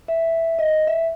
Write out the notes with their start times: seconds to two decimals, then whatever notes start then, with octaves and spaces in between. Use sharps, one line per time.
0.08 E5
0.59 D#5
0.87 E5